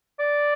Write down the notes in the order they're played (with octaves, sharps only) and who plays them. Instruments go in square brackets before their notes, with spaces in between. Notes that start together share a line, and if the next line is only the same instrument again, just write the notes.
[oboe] D5